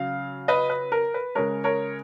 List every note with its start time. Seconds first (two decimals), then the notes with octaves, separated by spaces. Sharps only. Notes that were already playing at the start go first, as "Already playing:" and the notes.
Already playing: C#3 F#3 F5
0.48 B4 D#5
0.70 B4
0.92 A#4
1.14 B4
1.35 C#3 G#3 A#4 C#5
1.64 A#4 C#5